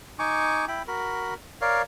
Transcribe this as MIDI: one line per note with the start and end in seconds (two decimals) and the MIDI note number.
0.19 0.65 63
0.19 0.65 80
0.19 0.65 85
0.19 0.65 86
0.68 0.83 64
0.68 0.83 79
0.68 0.83 83
0.88 1.34 66
0.88 1.34 70
0.88 1.34 83
1.61 1.82 70
1.61 1.82 73
1.61 1.82 74
1.61 1.82 77